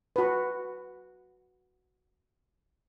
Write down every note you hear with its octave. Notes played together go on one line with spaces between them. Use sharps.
F#4 B4